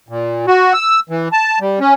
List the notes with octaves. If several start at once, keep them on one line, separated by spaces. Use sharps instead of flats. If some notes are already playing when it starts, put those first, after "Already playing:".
A#2
F#4
E6
E3
A5
G3
C#4